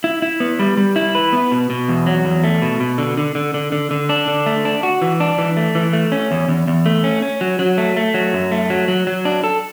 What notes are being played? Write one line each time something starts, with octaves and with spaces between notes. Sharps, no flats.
E4
E4
B3
G3
G3
E4
B4
B3
B2
B2
E2
F#3
E2
A3
B2
B2
D3
D3
D3
D3
D3
D3
D4
D3
A3
D4
F#4
E3
D4
E3
A3
E3
A3
C#4
E2
E2
E2
A3
C#4
C#4
F#3
F#3
A3
A3
F#3
F#2
A3
F#3
F#3
F#3
D4
A4